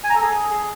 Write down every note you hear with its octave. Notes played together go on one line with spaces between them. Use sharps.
G#5
A#5
A4
G#4